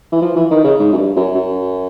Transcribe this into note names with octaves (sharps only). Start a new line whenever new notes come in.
E3
F3
E3
D#3
C#3
G#2
F#2
G2
F#2
F#2